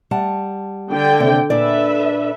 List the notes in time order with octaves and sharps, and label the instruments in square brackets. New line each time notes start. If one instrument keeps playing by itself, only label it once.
[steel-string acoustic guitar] G3 F#5 A5
[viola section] D3 G5
[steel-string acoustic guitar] D#2 C3 D5
[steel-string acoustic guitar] A#2 D4 D5 [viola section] A4 B4 E5